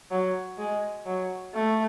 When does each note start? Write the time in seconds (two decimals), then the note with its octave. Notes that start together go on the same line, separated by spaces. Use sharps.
0.11 F#3
0.58 G#3
1.06 F#3
1.54 A3